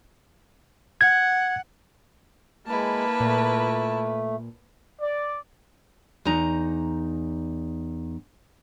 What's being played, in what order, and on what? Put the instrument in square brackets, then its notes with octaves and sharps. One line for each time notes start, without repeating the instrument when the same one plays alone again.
[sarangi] F#5 [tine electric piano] G#6
[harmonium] G#3 [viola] A#3 B4 [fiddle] E4 A5
[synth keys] A#2 [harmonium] A3
[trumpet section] D5
[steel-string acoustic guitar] E2 D#4 A#5